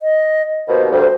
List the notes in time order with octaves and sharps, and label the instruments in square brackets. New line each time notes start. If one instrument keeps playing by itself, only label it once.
[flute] D#5
[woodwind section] D#2 B2 [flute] C5
[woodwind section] D2 G2 [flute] C5